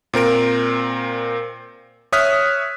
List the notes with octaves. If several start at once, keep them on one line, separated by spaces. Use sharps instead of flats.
A#2 C4 A#4 D7
C#5 E5 D#6 F6 F#6 B6